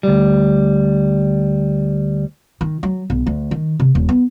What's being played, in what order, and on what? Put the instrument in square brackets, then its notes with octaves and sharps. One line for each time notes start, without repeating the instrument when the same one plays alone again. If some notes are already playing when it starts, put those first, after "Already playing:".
[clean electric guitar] D2 G3
[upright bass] D#3
F#3
B1
D2
D#3
C3
D#1
B3